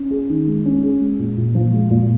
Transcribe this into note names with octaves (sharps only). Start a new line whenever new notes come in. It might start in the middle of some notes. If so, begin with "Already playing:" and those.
Already playing: C#4
G#4
D#3
G#3
C#4
G#4
G#3
A#2
A#2
F3
G#3
A#2